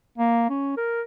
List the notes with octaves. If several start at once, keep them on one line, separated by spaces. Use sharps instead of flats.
A#3
C#4
A#4